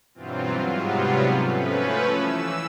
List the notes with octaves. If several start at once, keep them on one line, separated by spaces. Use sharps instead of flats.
G2 B2 E3 F#3 C4 F4
G#2 C3 F#3 G3 B3 F4
F3 A3 C#4 B4
E3 E6